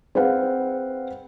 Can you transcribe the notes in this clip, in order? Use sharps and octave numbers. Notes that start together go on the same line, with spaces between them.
C4 G#4 B4 F5 F#5